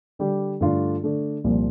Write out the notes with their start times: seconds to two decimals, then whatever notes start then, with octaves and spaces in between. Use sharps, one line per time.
0.19 D3 G3 D4 G4
0.61 G2 D3 A3 D4 F4
1.03 D3 A3 D4
1.44 C2 A#2 F3 A#3